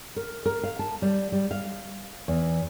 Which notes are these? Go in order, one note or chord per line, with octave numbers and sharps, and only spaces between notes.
A#4
A#4
F5
A5
G3
G3
F5
E2